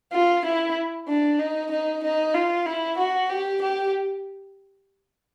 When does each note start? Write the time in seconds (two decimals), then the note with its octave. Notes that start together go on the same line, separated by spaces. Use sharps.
0.12 F4
0.45 E4
1.08 D4
1.39 D#4
1.71 D#4
2.03 D#4
2.34 F4
2.66 E4
2.98 F#4
3.30 G4
3.62 G4